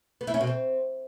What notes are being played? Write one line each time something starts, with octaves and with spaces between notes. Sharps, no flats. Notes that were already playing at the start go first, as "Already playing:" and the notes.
B3
E4
C#4
B2
C4